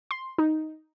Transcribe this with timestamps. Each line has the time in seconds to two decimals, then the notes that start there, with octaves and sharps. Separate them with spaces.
0.11 C6
0.38 D#4